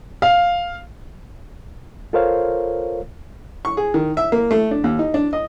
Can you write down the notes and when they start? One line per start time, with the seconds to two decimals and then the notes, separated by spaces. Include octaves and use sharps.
0.22 F5
2.13 F4 A4 A#4 C5 C#5 F5
3.65 C#6
3.77 G#4
3.94 D#3
4.17 E5
4.32 A#3
4.51 A3
4.71 D4
4.84 D#2
4.99 D#4
5.14 D4
5.33 D#5